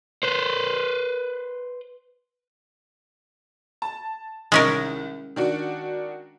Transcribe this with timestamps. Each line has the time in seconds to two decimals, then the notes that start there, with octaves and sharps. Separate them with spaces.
0.23 B4 C5
3.82 A5
4.52 C2 D#3 G#3 C#4 A#4
5.36 D#3 D4 F#4